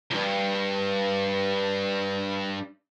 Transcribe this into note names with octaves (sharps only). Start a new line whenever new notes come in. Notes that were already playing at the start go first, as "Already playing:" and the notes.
C#2 G2